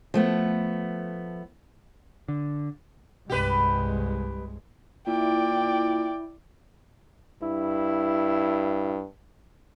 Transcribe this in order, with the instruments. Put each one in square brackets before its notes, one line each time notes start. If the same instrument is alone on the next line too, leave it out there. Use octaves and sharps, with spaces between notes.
[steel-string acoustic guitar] F3 A3 B3
[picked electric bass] D3
[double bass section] C2 G2 G#3 [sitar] G4 B4
[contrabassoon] A#2 [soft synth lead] E4 [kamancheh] D5 G5
[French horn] G2 [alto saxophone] E4